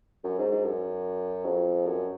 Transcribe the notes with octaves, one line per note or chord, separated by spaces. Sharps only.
F#2
G#2
G#2
F#2
F2
F#2